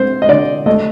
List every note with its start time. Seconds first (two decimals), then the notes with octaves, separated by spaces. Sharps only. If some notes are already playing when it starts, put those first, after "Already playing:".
Already playing: C4 C5
0.22 D#5
0.29 D3 D5
0.66 A3 D#5